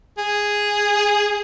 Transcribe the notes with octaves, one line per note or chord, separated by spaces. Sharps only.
G#4